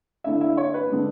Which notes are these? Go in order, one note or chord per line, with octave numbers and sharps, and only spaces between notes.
D3 A3 D4 E4 E5
E4 E5
C#5
B4
D3 G#3 D4